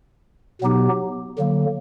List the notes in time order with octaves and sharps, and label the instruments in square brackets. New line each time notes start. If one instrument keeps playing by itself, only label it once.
[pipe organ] B2 F#3 B3 D#4 G4
D3 F#3 A#3